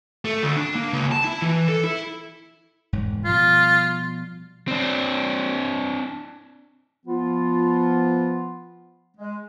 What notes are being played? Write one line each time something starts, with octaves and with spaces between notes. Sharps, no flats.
A3
D2
D4
A#3
C#2
A5
E4
E3
A4
E4
E1 G#2
B2 F3 G3 F4
C4 D4
F3 B3 F4
G#3